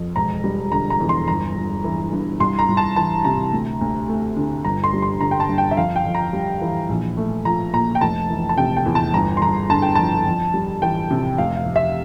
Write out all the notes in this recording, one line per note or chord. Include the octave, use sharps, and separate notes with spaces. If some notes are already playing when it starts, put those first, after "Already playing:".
Already playing: F2
E1 A#5
G3
D3 A#5
A#5
E2
C6
G1 A#5
G1
E3
G2
C2 C6
A#5
C2
A5
E3 A5
C3 A#5
D2
D2
A3
D3
G1 A#5
C6
G3
C6
D3 A#5
G5
A5
G2
G5
E5
F2 F5
G5
F2
A#5
G3
E3
A#1
A3
F3 A#5
A#2 A#5
G5
F1 A5
E3
A5
C3 G5
G5
E2
A5
G1 A#5
C6
G1 A#5
D3 A5
G5
F2 A5
F2
G3
E3 G5
C3
F1 F5
F5
F1
E5